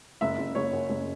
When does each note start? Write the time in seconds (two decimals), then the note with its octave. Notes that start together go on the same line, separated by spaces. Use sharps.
0.21 F#1 E5
0.38 F#1
0.55 F#1 C#5
0.73 F#2
0.89 F#1